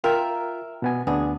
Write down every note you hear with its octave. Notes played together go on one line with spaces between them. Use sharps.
F4 A#4 E5 G5
B2 B3 G#5
D2 B3 D4 G#4